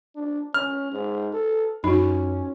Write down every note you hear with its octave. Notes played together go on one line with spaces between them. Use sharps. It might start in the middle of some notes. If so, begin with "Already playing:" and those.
D4
C#4 F6
G#2
A4
F#2 C#4 D#4 F#4